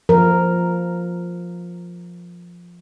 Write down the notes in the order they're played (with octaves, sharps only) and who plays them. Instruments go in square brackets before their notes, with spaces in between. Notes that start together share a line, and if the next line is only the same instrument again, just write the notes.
[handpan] F3 A#4